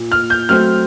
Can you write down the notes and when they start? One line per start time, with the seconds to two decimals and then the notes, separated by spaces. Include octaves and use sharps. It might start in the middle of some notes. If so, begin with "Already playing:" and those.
Already playing: A#2
0.12 F6
0.30 G6
0.49 F#3 A3 C4 F6